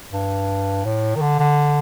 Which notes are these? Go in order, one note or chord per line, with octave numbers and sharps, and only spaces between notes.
G2
A2
D#3
D3
D3